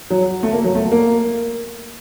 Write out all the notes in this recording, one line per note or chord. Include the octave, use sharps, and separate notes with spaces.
F#3
A3
A#3
F#3
A3
A#3